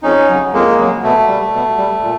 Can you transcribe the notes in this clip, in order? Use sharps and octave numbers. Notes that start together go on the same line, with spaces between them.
F2 C#4 D#4
C#3 F#3
F2 G#3 A#3
C#3 F#3
B2 A3
G3
B2
G3
A#2